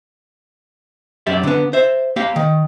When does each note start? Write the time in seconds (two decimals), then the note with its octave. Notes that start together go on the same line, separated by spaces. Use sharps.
1.27 F#2 G4 D5 E5
1.43 D3 B3
1.73 C5 E5
2.16 A#3 G4 F5
2.36 D#3